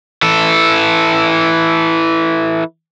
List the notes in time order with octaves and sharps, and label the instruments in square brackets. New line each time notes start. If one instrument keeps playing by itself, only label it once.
[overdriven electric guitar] E3 A4